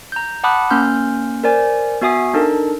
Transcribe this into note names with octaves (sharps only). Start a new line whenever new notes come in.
A#5 G6
F#5 A5 B5 D6 D#6 F#6
A#3 C#4 C6 F6 G6
A#4 C5 D5 G#5
B3 F#4 E5 G#5 D#6 C7
D4 D#4 A4 A#4